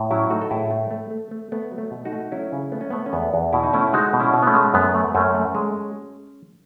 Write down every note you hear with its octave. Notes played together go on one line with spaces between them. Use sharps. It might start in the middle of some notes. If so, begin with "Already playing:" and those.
Already playing: A2
F#3 C#4 E4
A3 D#4 F#4
A4
A2 E4 G#4
A3
A3
A3
A3
A3 B3
F#3
A3
B2
D#4 F#4
A3
F#3 C#4 E4
C#3
A3 B3
C#4
A3 B3
C#4
E2 B3
E2
B2 E4
D#4
A3 C#4 E4
G#3 D#4 F#4
B2
C#4 E4
B2
B3
A3 C#4
G#3
F#2 B3
A3
F#2 A3 C#4
A3
G#3